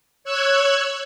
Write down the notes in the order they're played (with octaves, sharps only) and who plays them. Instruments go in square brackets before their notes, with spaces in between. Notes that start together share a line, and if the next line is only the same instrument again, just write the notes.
[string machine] C#5 E6 F#6 G#6